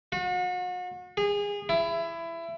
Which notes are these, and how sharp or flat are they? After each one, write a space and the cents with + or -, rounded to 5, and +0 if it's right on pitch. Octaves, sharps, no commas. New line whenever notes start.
F#4 -40
G#4 -25
E4 +20